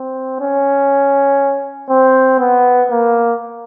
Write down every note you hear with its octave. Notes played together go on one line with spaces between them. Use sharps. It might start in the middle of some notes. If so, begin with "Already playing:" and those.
Already playing: C4
C#4
C4
B3
A#3